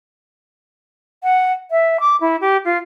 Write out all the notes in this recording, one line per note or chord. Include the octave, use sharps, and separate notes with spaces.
F#5
E5
D6
E4
G4
F4